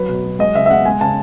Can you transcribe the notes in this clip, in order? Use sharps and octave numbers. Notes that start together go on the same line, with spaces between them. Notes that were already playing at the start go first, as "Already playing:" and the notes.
Already playing: F#3 B4
B2
F#3
G#3 D#5
C#3 E5
E5
G#3 F#5
G#3 G#5
C#3 A5